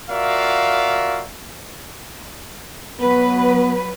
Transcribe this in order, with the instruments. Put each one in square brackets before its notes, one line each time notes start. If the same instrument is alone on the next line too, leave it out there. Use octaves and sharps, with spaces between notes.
[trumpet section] F4 F#4 A#4 D5 E5 F5
[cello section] F#3 B4 [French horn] B3